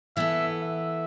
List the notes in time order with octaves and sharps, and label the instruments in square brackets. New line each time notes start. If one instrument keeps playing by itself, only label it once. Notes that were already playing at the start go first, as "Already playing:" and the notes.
[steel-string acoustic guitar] E3 B3 A4 [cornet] E5
[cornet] E5